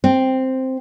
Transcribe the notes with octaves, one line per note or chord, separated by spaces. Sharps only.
C4